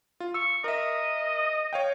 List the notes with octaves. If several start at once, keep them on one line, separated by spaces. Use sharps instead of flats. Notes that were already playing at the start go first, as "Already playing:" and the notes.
F4
C#6 E6
A#4 D#5 E5
C#5 F5 G5